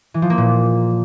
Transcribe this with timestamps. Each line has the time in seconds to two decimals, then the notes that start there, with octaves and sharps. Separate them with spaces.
0.14 E3
0.22 F3
0.30 A#3
0.38 A#2